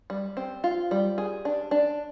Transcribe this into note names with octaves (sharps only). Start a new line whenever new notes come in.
G3
C4
F4
G3
G#4
D4
D4